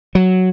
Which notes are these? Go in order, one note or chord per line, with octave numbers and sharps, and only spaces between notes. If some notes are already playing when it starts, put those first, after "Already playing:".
F#3